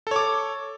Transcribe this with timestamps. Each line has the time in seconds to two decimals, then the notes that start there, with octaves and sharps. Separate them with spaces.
0.07 A4
0.11 C#5
0.16 D6